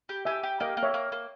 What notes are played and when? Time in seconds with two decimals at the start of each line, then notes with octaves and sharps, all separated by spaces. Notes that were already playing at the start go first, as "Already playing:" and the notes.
0.09 G4
0.25 G4 E5 G#5
0.43 G4
0.60 A#3 D#5 G5
0.77 A#3
0.83 C#5 E5
0.94 A#3
1.12 A#3